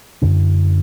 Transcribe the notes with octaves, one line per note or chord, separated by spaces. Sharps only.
F#2 D3 C#4